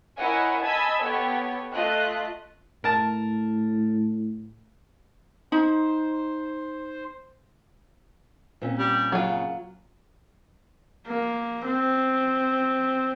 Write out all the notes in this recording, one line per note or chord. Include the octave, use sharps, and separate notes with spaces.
E4 A#4 C#5 D#5 F#5 G#5
D#5 G#5 A5 B5 E6 G#6
B3 G4 A4 C#5
A3 F4 D#5 F#6
A2 A#4 A5
D#4 C5
A#2 C4 C#4
G3
C#3 F#3 F4
A#3
C4